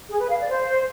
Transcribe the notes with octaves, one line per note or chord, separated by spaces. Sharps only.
G#4
B4
F5
D5
C5